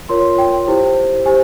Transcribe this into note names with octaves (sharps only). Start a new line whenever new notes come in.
F4 A#4 C#5 C6
G5
E4 G4 C5
G4 C5 G#5